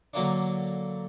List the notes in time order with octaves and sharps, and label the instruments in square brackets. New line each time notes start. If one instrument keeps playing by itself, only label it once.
[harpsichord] D3 F#3 A#3 D4